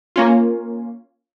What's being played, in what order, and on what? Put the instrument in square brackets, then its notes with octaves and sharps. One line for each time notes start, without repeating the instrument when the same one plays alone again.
[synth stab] A#3 C#4 F4